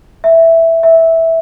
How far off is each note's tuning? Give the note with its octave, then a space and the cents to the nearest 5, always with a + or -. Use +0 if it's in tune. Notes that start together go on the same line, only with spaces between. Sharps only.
E5 +0
E5 -10